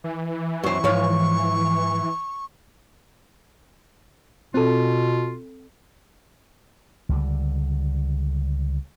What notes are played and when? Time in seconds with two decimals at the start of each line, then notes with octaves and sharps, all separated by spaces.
0.04 E3
0.64 F#2 C5 C#6
0.84 G#2 F3 C#5 F5
4.54 B2 C4 F4 A4
7.09 C#2 D3 G3